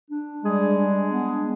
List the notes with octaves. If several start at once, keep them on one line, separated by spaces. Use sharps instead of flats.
D4
G3 G#3 G#4
D4
B3